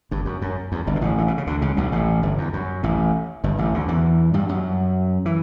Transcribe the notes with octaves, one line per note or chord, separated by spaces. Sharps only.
G1 G2
F#2
F#2
E2
G1 G2
B2
A1 A2
A2
B2
C#3
D2 D3
C#2 C#3
B1 B2
A1 A2
G1 G2
E2
F#2
A1 A2
G1 G2
A1 A2
D2 D3
E2 E3
G2 G3
F#2 F#3
E3